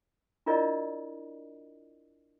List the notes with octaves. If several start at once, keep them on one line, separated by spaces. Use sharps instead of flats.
D4 E4 F4 A#4 D5 D#5